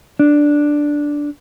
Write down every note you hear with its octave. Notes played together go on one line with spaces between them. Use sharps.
D4